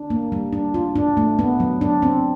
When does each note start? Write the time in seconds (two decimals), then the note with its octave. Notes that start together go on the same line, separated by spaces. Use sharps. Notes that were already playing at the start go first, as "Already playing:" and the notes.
Already playing: D4
0.10 A#3
0.32 G3
0.53 D4
0.74 F4
0.95 D4
1.17 A3
1.39 B3
1.60 F#3
1.81 D4
2.02 C4